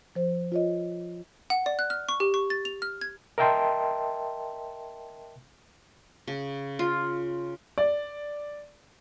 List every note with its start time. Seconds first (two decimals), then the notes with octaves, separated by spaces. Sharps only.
0.15 F3 C5
0.52 F4 C#5 D#5
1.50 F#5
1.66 D5
1.79 F#6
1.90 F6
2.09 C#6
2.20 G4
2.34 C#6
2.50 A6
2.65 F7
2.82 F6
3.01 G#6
3.38 A#4 D#5 E5 G5 A5 C6
6.27 C#3
6.79 F4
7.78 D5